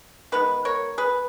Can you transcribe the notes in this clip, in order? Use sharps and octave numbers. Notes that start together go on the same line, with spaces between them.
D#3 G#3 B3 B4
A#4 C#5
G#4 B4